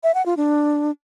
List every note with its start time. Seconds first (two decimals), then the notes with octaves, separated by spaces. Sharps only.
0.03 E5
0.15 F#5
0.26 F4
0.37 D4